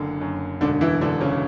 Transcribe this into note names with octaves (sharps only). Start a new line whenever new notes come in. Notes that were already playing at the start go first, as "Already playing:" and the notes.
Already playing: F#1 F#2 D3
F#2
E1 D3 D4
E3 E4
E1 D3 D4
C#3 C#4